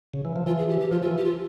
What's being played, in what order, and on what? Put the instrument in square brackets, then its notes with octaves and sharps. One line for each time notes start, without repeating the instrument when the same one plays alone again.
[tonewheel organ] C#3
E3
F3
[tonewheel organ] E3 [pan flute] F4
[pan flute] G#4
G4
G4
[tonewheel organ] F3 [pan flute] F4
[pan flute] F4
[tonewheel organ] E3
[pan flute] G4
F4